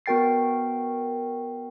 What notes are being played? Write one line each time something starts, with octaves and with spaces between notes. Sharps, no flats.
B3 F#4 A#4 G5 A6 C7